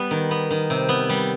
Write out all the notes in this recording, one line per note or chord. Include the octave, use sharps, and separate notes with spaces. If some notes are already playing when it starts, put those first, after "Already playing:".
Already playing: G3 B3
D#3
B3
D#3
C3
B3
G3